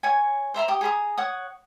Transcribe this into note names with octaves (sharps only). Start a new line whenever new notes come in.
C#5 G#5
C5 E5 A#5 C6
G4 D#6
G#4 A#5 B5 D#6
C#5 F#5 D#6